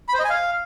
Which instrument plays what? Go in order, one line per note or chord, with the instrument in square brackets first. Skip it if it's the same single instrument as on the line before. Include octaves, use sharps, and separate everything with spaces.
[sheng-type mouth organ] B5
C5
D#5
G#5
F5